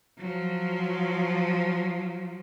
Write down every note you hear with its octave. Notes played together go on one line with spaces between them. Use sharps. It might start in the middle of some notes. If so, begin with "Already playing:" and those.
F3 F#3